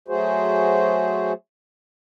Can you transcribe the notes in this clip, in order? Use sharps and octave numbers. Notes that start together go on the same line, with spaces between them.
F#3 A3 F#4 G#4 C5